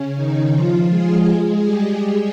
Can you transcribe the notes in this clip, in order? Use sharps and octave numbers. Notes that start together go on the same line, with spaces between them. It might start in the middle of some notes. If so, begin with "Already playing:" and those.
Already playing: C#3 C#4
D#3 D#4
F3 F4
G#3 G#4
G3 G4